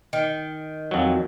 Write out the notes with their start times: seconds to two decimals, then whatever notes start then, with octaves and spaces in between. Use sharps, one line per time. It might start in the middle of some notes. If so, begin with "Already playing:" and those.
0.13 D#3
0.91 F2 F#3